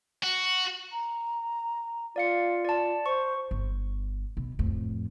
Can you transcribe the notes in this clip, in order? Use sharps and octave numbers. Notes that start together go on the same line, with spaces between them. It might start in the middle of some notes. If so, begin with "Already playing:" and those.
F#4
A#5
F4 D5 F5 C#7
D5 A5
C5 C#6
G1
B2
F2 A2